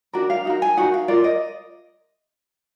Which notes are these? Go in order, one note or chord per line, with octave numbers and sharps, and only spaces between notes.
D4 F#4 A#4 D5
F5
D#4 F#4 A#4
G#5
D#4 F#4 A#4 F#5
F5
F4 A#4 D5
D#5